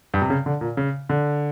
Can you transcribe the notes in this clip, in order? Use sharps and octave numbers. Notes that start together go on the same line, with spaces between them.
G2
C3
C#3
D3
A#2
C#3
D3